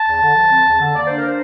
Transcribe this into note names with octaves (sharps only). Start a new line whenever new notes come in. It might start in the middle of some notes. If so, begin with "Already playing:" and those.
Already playing: A5
E2
D3
F3
C4
E2
D3
A#3 D5
D4 C5
A#4
C5